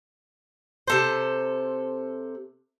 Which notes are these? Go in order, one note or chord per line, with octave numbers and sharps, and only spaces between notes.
C3 A4 C5